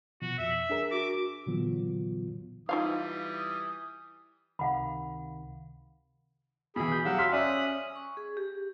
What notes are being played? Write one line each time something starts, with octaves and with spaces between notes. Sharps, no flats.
B2 F3 F#4
F2 E5
D4 G#4 A#4
F#4 D6
A#2 D3 E3 F#3 B3 F4
E3 G3 D#4 F4 F5 D#6
C#2 C3 D#3 F5 F#5 B5
B2 E3 G#4 B5
G6
F#3 G4 F5 F#5 E6
C6 F6 B6
C#4 D5 E5 D#6 F#6
C#6
G#4
G4